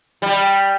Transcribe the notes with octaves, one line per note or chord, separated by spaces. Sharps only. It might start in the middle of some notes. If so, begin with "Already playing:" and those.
G3